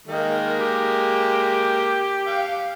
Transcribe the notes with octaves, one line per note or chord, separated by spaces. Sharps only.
D#3 G#3 A#3
G4
F5 G5